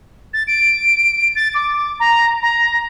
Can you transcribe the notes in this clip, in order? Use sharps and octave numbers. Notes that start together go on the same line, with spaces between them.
A6
D7
A6
D6
A#5
A#5